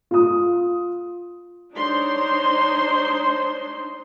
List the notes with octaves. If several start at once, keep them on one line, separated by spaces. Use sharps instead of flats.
F4 D#6
D4 D#4 C5 C#5 C6